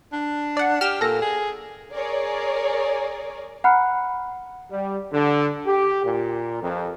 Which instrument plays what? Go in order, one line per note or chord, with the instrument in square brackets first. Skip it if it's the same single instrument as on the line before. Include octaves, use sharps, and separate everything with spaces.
[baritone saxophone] D4
[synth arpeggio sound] D5 F#5
[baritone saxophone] G4 [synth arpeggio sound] F6 E7
[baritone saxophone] A#2 [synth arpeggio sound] A4 A#6
[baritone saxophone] G#4
[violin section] G#4 A#4 C#5 D5
[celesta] F#5 A#5 B5 F6 F#6 C#7
[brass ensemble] G3
D3
G4
A#2
F2